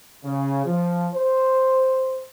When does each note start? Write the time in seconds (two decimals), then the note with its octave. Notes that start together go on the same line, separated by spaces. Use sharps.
0.25 C#3
0.66 F3
1.15 C5